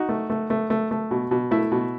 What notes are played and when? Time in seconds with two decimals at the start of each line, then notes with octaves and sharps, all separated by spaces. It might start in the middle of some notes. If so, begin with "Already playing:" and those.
Already playing: D#4 F#4
0.09 A3
0.30 A3
0.50 A3
0.70 A3
0.91 A3
1.11 B2
1.31 B2
1.51 A3 E4
1.72 B2